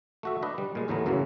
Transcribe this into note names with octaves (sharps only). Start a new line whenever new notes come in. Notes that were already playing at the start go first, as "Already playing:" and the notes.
A3 F#4 E5
D4 B4 D#5
G3
A#2 G#3
D#2 A2 E3 A3 B3 A#5
F#2 C#3 E3 F#3 A#3